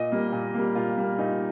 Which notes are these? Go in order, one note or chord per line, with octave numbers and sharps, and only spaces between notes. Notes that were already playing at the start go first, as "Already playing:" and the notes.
Already playing: A#2 D#5
G3 A#3
A#2
G3 A#3
A#2 F4
G3 A#3
A#2 D#4